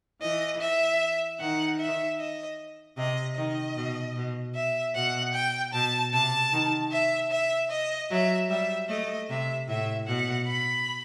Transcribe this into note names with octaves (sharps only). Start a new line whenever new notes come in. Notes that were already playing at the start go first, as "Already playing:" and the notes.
E3 D#5
E5
D#3 F#5
E5
D#5
C3 D#5
D#3 D#5
B2
B2
E5
B2 F#5
G5
B2 A5
C3 A5
D#3
E5
E5
D#5
F#3 E5
G3 E5
A3 D#5
C3 E5
A2 E5
B2 F#5
B5